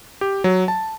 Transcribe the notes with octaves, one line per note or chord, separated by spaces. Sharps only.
G4
F#3
A5